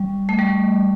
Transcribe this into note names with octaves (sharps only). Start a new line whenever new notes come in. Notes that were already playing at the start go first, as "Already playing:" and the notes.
Already playing: G3
A3
G3